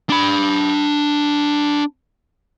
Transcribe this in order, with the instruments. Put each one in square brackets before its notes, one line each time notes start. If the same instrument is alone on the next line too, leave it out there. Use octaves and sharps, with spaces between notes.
[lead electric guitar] D4 B5